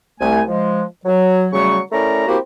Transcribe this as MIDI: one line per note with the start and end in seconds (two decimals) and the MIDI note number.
0.21 0.42 36
0.21 0.42 57
0.21 0.42 80
0.48 0.83 53
0.48 0.83 56
1.05 1.48 54
1.53 1.79 49
1.53 1.79 54
1.53 1.79 55
1.53 1.79 57
1.53 1.79 85
1.92 2.26 57
1.92 2.26 61
1.92 2.26 64
1.92 2.26 70
1.92 2.26 74
1.92 2.26 82
2.28 2.38 58
2.28 2.38 60
2.28 2.38 64
2.28 2.38 66
2.28 2.38 67